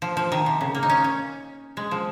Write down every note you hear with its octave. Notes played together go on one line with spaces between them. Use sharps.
F3
F3
D#3
C3
C#3
A#3
D#4
C#4
C#4
G#3
F3